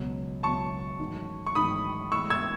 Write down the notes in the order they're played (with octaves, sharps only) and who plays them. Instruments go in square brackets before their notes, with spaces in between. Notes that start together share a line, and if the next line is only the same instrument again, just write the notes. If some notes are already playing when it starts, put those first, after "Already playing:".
Already playing: [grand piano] C#2 B2 F#3
[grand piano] C#2 B2 F#3 [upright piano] A5 C#6
[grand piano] A1 G#2 D#3 F#3
[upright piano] C#6
[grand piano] A1 G#2 D#3 F#3 [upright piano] B5 D#6
[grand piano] A2 E3 G#3 [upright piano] C#6 E6
[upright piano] E6 G#6